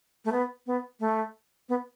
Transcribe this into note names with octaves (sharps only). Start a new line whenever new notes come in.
A3
B3
B3
A3
B3